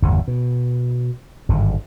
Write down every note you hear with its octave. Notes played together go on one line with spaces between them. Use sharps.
G1 E2 A2 C#3
B2
G#1 G2 D3